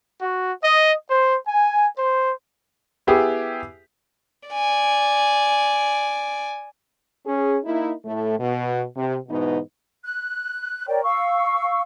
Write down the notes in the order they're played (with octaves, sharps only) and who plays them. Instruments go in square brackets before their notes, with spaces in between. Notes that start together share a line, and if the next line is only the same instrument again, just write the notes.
[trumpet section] F#4
D#5
C5
G#5
C5
[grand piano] B3 E4 G4 G#4
[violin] D5 G#5
[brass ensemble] C#4 G#4
A#3 D#4 E4
A2 A3
B2
C3
G#2 B2 E3 B3 D#4
[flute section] F#6
A#4 C#5 D5 G5
F5 C#6 E6